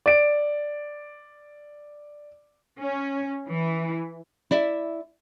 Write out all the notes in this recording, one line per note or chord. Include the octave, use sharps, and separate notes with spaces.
D5 D7
C#4
E3
E4 D5 E5